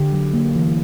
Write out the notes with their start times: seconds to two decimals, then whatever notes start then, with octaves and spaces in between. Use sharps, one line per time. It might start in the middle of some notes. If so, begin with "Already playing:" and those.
Already playing: D3 G4
0.12 F#3
0.34 A#3
0.55 E3